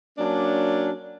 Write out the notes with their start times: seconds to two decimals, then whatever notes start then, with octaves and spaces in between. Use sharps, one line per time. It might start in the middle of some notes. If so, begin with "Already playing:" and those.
0.18 F#3 A#3 C#4 D4